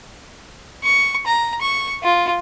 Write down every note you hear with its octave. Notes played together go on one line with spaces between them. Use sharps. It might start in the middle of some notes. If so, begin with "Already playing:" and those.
C#6
A#5
C#6
F4